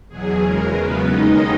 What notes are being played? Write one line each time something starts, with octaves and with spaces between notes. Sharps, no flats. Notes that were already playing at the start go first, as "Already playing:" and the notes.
E2 B2 F#3 G#4
E2 C#3 G#3 A#4
E2 C#3 F#3 B3 B4
D#2 D#3 G#3 D#4 D#5